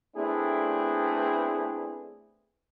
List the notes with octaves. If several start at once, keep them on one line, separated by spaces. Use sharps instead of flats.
A3 B3 C4 D4 E4 G#4